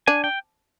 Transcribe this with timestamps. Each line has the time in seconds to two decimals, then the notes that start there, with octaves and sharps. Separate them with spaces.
0.07 D4 G#5
0.24 G5